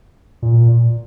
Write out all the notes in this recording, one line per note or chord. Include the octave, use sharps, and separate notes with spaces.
A#2